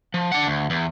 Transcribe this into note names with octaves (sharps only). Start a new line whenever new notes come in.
F3
D4 F#5
D2
E2